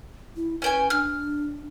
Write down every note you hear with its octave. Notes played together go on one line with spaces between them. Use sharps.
E4
C#4 B4 G5 G#5
D4 F6